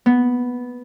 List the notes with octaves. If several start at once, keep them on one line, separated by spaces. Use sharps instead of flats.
B3